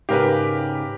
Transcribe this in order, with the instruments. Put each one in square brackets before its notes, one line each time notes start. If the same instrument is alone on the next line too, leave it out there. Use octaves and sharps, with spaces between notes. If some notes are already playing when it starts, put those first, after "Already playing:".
[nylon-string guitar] G#2 C#3 F5 [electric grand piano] G4 A#4 B4